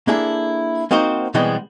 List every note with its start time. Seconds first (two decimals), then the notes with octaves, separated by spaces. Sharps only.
0.08 A#3 D4 E4 G#4 A4
0.91 A#3 C4 D#4 F#4 C5
1.34 B2 E3 G3 G#3 B3 C4